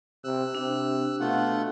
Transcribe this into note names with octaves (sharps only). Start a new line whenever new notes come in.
C3 E6 F#6
C3 D4
B2 A3 F4 F#5